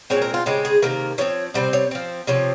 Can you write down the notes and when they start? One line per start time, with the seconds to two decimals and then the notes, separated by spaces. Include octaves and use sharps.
0.10 A#2 G#3 C4 C#5
0.22 A#4
0.34 F4
0.46 C#3 G#3 C4 G4
0.65 G#4
0.82 C3 D#3 A#3 A#4
1.18 F3 C4 C#5
1.54 C3 G3 C4 C5
1.73 C#5
1.91 F3 C4
2.27 C3 F3 C4 C#5